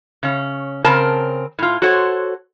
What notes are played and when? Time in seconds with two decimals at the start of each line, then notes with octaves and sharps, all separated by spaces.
0.23 C#3 C#4
0.84 C#3 C4 A#4 A5
1.59 A2 F4
1.82 F#4 A4 C5 C#5 F#5